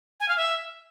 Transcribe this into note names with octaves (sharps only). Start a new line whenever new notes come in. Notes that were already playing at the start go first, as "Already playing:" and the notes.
G#5
F5
E5